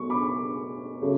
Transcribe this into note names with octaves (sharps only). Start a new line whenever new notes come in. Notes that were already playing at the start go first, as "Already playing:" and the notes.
Already playing: B2 F#3 A3 C#6
B5 D6
C#3 F#3 A3